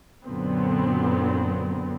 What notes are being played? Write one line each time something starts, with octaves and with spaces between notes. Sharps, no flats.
F#2 A#2 D3 F#3 B3 C4